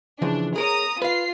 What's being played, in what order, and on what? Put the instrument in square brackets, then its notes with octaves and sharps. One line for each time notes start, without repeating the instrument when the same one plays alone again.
[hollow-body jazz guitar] C#3 E3 F3 [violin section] D4
[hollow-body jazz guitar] G#4 A#4 C#5 [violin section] A#5 D#6
[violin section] F4 C7 [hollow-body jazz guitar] B4 F5